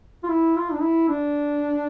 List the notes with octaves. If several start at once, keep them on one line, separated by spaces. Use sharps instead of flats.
F4
E4
F4
D4
E4
D4